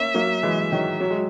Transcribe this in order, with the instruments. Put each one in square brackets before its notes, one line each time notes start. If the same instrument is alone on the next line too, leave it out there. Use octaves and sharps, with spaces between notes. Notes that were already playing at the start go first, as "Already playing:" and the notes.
Already playing: [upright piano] A#3 C#4 [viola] E5
[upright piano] F#3 A#3
E3 G#3
D#3 F#3
F#3
G#3